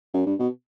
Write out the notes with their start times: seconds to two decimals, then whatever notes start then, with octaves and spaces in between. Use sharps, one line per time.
0.13 F#2
0.26 G2
0.39 B2